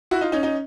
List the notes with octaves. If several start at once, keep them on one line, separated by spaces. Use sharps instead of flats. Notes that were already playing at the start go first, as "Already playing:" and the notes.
E4 F#4
D#4 F4
C#4 D#4
C#4 D#4